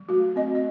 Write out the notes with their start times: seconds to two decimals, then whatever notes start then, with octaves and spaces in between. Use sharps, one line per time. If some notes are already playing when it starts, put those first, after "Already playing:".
Already playing: F#3
0.09 A3 F#4
0.36 C4 D#5
0.55 D#5